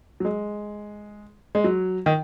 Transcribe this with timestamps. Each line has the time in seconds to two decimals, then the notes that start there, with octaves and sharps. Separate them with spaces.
0.20 F#3
0.25 G#3
1.55 G#3
1.64 F#3
2.06 D#3